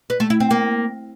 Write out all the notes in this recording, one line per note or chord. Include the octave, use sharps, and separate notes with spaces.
B4
A3
E4
C4
A#3